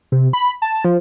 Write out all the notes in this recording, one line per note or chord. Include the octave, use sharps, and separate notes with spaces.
C3
B5
A5
F3